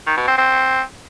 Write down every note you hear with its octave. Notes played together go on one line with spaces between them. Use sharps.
D#3
B2
C4
C4